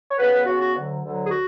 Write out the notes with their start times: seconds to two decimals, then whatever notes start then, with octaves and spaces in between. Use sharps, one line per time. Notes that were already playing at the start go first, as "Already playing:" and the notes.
0.09 C#5
0.17 C#3 F#3 B3 B4
0.45 C#3 F#3 B3 F#4
0.60 F#4
0.73 D2 D3 F#3
1.02 D2 D3 F#3
1.25 G#4
1.30 F#4